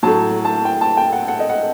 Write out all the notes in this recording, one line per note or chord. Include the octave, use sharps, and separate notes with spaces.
A2 F#3 A5
A5
G5
A5
G5
F#5
F#5
D#5
F#5